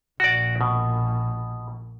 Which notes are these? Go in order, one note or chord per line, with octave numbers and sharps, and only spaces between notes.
A#1 A#2 F#4 D5
B2